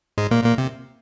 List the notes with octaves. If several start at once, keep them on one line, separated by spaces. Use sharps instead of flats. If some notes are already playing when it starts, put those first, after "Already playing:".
G#2 G#3
A#2 A#3
A#2 A#3
C3